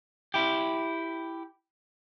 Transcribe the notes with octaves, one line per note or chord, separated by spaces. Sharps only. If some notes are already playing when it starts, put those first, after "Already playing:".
E4 G4